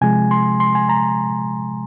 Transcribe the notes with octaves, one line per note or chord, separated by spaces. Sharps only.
C3 F3 G#3 G#5
C6
C6
G#5
A#5